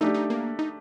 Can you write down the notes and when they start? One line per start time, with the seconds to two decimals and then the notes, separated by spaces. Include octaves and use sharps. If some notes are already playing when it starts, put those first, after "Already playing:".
0.01 A3 D4 D#4 G4
0.14 D#4
0.30 A#3
0.59 D#4